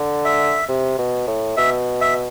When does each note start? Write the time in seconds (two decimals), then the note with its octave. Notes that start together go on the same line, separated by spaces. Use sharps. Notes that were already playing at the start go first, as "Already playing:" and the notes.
Already playing: D3
0.25 E5
0.69 C3
0.98 B2
1.27 A2
1.57 B2 E5
2.01 E5